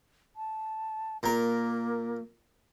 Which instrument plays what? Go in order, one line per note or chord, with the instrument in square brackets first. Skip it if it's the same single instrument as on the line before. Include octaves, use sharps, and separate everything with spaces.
[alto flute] A5
[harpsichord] A#2 A#4 [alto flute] A#3